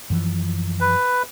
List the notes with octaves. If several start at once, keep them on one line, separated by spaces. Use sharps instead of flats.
F#2 E3 F3
B4